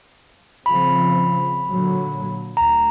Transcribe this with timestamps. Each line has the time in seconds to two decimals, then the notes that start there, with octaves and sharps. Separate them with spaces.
0.66 C#3 F3 C4 B5
1.69 A#2 D3 F#3
2.57 D2 A#5